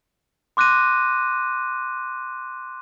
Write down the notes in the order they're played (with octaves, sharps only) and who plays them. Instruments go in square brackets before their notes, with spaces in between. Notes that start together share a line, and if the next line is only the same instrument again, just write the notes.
[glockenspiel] C6 D6 F#6 A#6 D#7